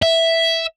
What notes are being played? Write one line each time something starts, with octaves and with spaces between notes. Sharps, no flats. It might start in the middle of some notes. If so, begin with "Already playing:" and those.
E5